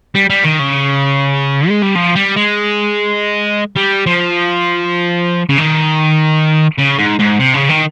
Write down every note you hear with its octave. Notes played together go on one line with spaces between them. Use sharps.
G3
G3
D#3
C#3
G#3
G3
F3
G3
G#3
G3
F3
C#3
D#3
C#3
G#2
G#2
C3
C#3
D#3